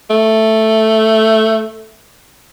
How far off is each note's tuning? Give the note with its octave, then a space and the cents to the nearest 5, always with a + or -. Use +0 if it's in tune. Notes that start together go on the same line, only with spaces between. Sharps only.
A3 +5